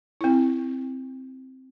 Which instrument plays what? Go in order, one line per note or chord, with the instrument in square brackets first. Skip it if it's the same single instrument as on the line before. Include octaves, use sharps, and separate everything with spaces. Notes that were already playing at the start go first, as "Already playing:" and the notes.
[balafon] C4 E4